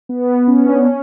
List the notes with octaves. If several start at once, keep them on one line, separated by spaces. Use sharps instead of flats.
B3
C#4
D4
C#4